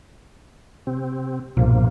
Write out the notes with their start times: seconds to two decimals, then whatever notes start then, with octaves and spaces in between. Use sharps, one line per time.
0.87 C3 C4
1.57 B1 G2 A#2 F3 A#3